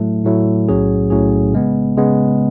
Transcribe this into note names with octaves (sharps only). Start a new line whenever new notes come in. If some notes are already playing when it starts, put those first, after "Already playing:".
Already playing: A2 F#3 A3 E4
A2 F#3 A3 E4
B1 A2 F#3 C#4 G#4
B1 A2 F#3 C#4 G#4
C#3 G#3 B3
C#3 G#3 B3